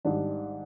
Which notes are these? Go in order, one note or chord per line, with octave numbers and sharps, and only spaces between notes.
G#1 G#2 D#3 G3 D4